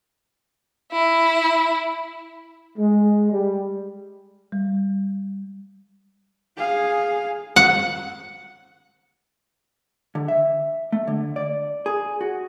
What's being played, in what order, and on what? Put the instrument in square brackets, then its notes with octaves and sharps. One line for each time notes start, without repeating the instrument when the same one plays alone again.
[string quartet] E4
[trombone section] G#3
G3
[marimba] G3
[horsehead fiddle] G#4 F5
[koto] F#5
[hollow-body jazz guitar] D3
E5
A3
D3
D5
G#4
F#4